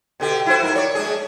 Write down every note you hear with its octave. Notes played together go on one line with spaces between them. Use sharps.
B2 D3 G4
E4 F#4 C5
G#2 A#4
C#5 D5
G#3 D4 G#4